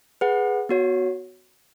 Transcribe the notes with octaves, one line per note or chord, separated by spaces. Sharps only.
G#4 B4 F#5
B3 F#4 C#5